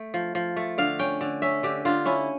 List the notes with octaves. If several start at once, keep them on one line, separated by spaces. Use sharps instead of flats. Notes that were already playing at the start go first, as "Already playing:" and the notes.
Already playing: A3 G5
F3
F3
A3
D3 F5
C#4 G5
D3
C#4 E5
D3 G4
D3 F4
C#4 E4